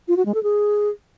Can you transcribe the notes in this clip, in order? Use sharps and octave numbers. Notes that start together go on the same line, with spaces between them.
F4
F#4
G#3
A4
G#4